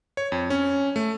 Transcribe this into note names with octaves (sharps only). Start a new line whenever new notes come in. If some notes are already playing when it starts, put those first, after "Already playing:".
C#5
F2
C#4
A3